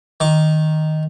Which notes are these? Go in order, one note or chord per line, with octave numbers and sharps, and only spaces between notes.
D#3 D6